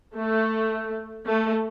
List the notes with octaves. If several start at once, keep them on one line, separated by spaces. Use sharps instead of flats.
A3
A3